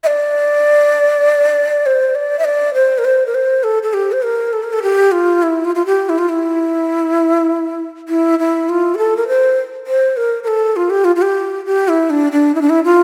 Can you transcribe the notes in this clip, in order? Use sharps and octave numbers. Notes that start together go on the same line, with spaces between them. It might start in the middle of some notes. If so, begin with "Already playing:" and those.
E5
D5
C5
D5
E5
D5
C5
A#4
C5
A#4
C5
A4
A4
G4
C5
A#4
A4
A#4
A4
G4
F4
E4
F4
F4
G4
E4
F4
E4
E4
E4
F4
G4
A4
A#4
C5
C5
A#4
A#4
A4
F4
G4
F4
F4
G4
G4
E4
D4
D4
E4
D4
E4
F4